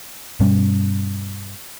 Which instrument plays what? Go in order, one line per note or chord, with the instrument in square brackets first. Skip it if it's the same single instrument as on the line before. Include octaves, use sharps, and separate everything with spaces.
[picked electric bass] G2 B2 G3 C#4